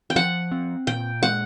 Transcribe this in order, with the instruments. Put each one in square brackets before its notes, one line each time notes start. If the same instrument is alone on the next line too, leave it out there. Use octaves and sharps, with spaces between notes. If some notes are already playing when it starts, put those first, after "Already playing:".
[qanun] G5
[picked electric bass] F3 [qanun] F#5
[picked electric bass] C4
[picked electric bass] A#2 [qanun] G5
[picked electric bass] G#3 [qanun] F#5